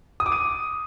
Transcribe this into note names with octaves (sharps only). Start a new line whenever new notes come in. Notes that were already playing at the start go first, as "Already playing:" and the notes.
D#6
D6
D#7